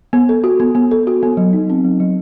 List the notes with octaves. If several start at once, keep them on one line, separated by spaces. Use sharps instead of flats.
B3
A4
F#4
B3
B3
A4
F#4
B3
F#3
D#4
C4
F#3
F#3